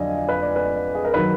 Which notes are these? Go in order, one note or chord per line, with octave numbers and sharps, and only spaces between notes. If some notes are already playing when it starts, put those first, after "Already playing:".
Already playing: F2 D3 F#3 D5 D#5 F5 G#5
B4
D5
B4
G#4
A#4
D#3 F#3 B4